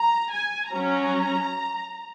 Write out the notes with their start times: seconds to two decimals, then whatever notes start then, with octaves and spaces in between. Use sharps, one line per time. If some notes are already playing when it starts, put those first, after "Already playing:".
Already playing: A#5
0.31 G#5
0.72 F#3 C#4 A#5